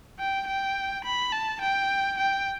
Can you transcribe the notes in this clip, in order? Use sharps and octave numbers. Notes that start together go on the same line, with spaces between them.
G5
G5
B5
A5
G5
G5